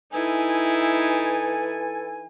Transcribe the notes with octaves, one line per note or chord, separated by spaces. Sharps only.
E3 D#4 E4 A4 G#5